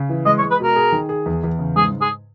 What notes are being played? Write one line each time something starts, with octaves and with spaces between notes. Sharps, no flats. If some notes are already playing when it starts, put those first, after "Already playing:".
Already playing: C#3
E3
G#3 D#5
C#5
G#3
B4
B2 A#4
G#4
D#3
G#4
E2
E2
C#3
G#2 G#4
G#2
G#4